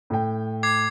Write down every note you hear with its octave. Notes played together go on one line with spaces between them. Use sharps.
A2 G5
D6 G#6 C7